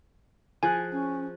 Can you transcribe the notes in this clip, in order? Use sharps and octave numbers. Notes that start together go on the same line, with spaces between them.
F3 G#4 G#5 F#6
C#4